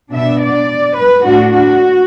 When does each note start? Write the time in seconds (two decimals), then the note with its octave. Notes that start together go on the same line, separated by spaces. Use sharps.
0.13 B2 B3 D4 E5
0.41 D5
0.98 B4
1.25 A2 A3 D4 F#4
1.53 F#4